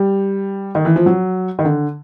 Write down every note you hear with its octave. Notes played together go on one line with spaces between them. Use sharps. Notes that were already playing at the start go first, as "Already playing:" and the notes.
Already playing: G3
D#3
E3
F3
F#3
D#3
D3